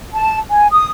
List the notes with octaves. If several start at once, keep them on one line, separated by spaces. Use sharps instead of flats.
A5
G#5
D#6